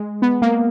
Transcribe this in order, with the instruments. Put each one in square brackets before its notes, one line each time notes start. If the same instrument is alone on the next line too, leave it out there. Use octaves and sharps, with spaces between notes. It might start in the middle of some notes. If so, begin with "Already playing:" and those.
Already playing: [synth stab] G#3
B3
A#3